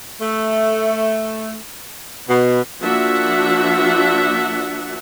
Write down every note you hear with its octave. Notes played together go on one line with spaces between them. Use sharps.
A3
B2
F3 A#3 D4 F#4 E5 F#5